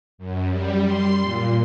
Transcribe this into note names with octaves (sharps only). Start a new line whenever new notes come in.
F#2
G3
C6
A#2